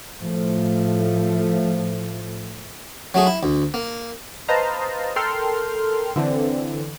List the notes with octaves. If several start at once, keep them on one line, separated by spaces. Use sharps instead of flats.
A2 F3 A3
F#3 A3 G#4
E4
D2
A#3
B4 C5 D#5 F5 A5 A#5
A4 A#4 G5 C6 F6
D3 E3 C4